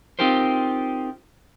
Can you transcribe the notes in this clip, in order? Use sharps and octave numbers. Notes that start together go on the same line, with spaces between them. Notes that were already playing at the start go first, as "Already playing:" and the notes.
C4 D#4 F4 G4 A#4 C5